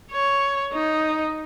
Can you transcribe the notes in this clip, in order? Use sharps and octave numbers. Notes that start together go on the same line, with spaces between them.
C#5
D#4